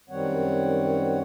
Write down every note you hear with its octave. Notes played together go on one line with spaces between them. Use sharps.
F#2 D#3 G3 C4 C#5 F#5